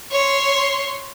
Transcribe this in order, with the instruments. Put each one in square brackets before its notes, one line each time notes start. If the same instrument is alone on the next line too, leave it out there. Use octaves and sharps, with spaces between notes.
[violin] C#5 C6